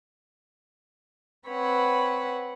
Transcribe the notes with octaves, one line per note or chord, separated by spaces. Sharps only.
C4 B4 C#5 F#5 B5